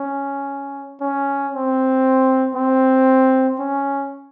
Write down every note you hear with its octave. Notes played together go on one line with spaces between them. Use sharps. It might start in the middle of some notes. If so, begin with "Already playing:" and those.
Already playing: C#4
C#4
C4
C4
C#4